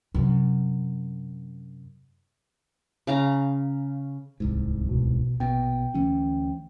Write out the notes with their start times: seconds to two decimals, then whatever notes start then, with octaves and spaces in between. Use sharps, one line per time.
0.14 F#2 C3
3.07 C#3 F5 A#5
4.40 D1 C2 G#2
4.85 A1 B2
5.40 A#1 B2 G5
5.94 D2 E3 C#4